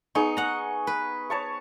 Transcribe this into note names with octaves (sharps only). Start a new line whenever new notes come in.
B3 D#4 G#4 C#6
F#5 A#5
B4
C#5 A5 C#6